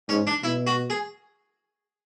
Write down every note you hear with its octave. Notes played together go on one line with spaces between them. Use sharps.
G#2 C#4
D4
B2 E4
F#4
G#4